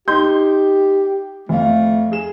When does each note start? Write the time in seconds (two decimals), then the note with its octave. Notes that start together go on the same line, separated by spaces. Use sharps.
0.08 D#4 G4 C6 G6
1.49 F2 A3 F5
2.12 G#4 E7